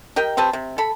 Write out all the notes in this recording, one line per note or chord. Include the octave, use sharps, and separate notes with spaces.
G4 A#4 D#5 G5
C4 G4 B4 A5
C3
A4 B5